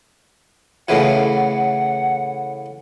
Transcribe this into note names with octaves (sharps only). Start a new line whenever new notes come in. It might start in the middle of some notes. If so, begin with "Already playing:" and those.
A2 C#3 E3 F#5